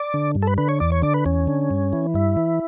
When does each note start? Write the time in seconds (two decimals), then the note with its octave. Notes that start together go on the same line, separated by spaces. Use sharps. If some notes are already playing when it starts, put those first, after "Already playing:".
Already playing: D5
0.14 D3
0.35 G2
0.42 A4
0.47 B4
0.58 D3 B4
0.69 C#5
0.80 E2 D5
0.92 C#5
1.02 D3 D5
1.14 B4
1.25 E2 C#4
1.47 D3
1.71 G2
1.93 E3
2.14 G2 E4
2.37 E3